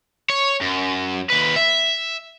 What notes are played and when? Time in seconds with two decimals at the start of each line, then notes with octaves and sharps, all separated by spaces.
0.30 C#5
0.61 F#2
1.30 D#2 B4
1.56 E5